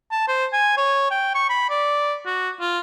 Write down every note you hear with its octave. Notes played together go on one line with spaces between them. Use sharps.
A5
C5
G#5
C#5
G5
C#6
B5
D5
F#4
F4